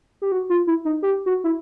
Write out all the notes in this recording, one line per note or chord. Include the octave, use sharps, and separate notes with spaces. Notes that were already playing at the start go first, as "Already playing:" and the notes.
G4
F#4
F4
E4
D#4
G4
F#4
E4